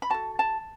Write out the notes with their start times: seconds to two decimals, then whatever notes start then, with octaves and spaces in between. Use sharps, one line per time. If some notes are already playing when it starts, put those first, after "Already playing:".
0.02 B5
0.10 F#4 A4 A5
0.39 A5